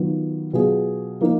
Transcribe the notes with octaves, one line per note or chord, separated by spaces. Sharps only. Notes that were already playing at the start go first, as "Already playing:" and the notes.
Already playing: D#3 F#3 B3 F4
B2 F#3 B3 F4 G#4
F3 A#3 D#4 A#4